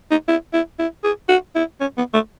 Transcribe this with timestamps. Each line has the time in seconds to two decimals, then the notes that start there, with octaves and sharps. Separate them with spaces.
0.11 D#4
0.28 E4
0.53 E4
0.79 E4
1.04 G#4
1.29 F#4
1.55 E4
1.81 C#4
1.98 B3
2.14 A3